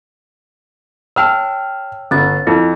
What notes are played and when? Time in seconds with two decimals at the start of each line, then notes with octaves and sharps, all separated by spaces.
1.16 C#5 G5 A5 E6 F6
2.11 G1 C#4 A6
2.47 F2 E4